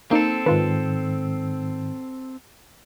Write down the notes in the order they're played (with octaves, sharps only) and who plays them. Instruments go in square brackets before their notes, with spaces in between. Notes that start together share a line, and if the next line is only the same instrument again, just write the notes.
[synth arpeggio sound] A#3 D#4 [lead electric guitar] C4 A4
[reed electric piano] G#2 D#3 [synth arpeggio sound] F4 B4